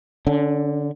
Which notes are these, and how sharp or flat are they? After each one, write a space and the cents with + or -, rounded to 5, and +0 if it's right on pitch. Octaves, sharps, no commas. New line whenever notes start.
D3 +0 C#4 +30